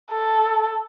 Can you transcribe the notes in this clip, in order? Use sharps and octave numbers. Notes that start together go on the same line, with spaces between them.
A4